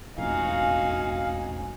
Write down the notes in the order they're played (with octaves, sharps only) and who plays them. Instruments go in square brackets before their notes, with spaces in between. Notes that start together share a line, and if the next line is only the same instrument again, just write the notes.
[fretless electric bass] E1 A1 F2 [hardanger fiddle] D#4 F#4 [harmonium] F5 [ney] G#5